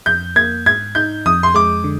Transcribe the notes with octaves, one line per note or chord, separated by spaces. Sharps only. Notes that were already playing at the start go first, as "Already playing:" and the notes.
F2 G6
A#3 G#6
G#2 G#6
D#4 G6
F2 D#6
C6
G#3 D6
D3